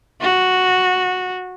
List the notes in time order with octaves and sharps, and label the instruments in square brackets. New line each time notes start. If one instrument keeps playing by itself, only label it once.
[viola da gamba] F#4